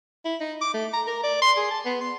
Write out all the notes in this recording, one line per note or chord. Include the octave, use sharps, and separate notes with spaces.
E4
D#4
D6
A3
A#5
A#4
D5
C6
G#4
A5
B3
C6